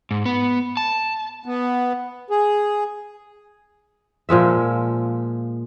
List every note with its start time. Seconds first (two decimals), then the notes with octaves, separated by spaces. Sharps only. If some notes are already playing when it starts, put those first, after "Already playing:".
0.11 G#2
0.26 B3
0.77 A5
1.46 B3
2.30 G#4
4.29 A#2 F3 G#3 E5